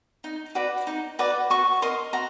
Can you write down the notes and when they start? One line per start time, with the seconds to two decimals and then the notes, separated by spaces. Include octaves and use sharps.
0.24 D#4
0.55 F#4 B4 D5
0.87 D#4
1.19 F#4 B4 D5
1.50 F#4 C#6
1.82 A#4 D#5 C6
2.13 F#4 A#5